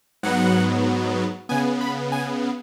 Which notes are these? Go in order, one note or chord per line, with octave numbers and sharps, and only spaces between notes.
G#2 F#3 B3 F#5
C#3 B3 G#5
B5
G#5